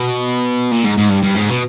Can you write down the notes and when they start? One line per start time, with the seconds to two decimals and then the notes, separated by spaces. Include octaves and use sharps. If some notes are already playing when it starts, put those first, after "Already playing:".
Already playing: B2
0.71 A#2
0.84 G#2
0.98 G#2
1.10 G2
1.24 G2
1.36 G#2
1.50 B2